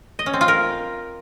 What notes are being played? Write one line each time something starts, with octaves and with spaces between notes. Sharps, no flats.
D#5
C#4
C4
F4
A#4